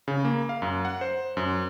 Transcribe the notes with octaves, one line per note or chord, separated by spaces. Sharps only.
C#3
A#3
F5
F#2
F#5
C5
F#2